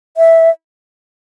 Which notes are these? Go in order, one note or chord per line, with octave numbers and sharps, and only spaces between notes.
E5